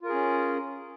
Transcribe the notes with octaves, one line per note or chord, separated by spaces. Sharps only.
C#4 F4 G#4 A#4